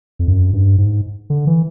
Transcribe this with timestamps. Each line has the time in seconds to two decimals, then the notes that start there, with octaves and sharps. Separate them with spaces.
0.19 F2
0.28 F#2
0.53 G2
0.78 G#2
1.30 D3
1.47 E3